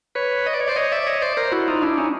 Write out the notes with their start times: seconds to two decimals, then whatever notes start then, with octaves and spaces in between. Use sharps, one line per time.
0.15 B4 C#5
0.46 D#5
0.53 D5
0.61 C#5
0.68 C5 D5
0.76 C#5 D#5
0.92 D5 E5
1.07 C#5 D#5
1.22 C5 D5
1.37 A#4 C5
1.52 E4 F#4
1.68 D#4 F4
1.82 D4 E4
1.98 C#4 D#4